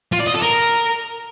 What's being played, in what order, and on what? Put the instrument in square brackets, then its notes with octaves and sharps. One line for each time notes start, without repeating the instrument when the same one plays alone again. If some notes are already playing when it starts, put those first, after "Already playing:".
[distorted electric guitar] F4
D5
D#5
A4
A#4